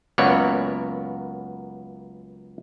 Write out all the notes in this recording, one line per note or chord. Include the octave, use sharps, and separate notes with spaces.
C#2 F#2 A#3 B3 C#5 D5